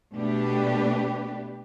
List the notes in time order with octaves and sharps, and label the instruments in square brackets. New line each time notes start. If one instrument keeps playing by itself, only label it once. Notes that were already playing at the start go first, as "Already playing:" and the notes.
[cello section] B2 A3 D4 G4 B4